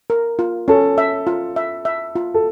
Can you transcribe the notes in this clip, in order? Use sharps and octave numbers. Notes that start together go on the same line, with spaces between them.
A#4
F4
C#4 A4
E5
F4
E5
E5
F4
A4